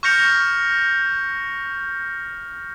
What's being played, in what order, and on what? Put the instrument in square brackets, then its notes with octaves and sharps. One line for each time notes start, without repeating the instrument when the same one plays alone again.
[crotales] C#6 F6 G6 A#6 C#7 F7